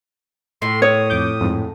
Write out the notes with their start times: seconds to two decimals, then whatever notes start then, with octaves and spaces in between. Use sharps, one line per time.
0.62 A2 C6
0.82 C#5 D#6
1.10 F2 D6 G6
1.40 F2 G#2